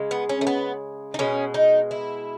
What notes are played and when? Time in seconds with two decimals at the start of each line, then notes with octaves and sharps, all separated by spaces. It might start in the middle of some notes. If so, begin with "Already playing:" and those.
Already playing: C#3 G#3
0.11 B3
0.29 C#4
0.41 A3
0.47 B3
1.14 D#4
1.19 B2 G#3 C#4
1.54 D#4
1.91 E4